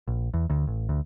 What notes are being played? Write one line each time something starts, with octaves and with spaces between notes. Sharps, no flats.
A#1
E2
D2
A1
D2